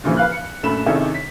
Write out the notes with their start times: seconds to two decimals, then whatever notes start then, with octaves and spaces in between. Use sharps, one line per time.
0.04 G2 A#2 C#3 E3 F3
0.17 B4 F5 F#6
0.32 C#7
0.63 A#1 F#2 A3 B5 E7
0.86 C3 D#3 C#4 E4 G#4 A4
1.14 B6